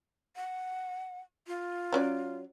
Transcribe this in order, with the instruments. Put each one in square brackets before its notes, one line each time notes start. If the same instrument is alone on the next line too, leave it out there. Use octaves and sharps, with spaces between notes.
[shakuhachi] F#5
F4
[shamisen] F#3 C#4 D5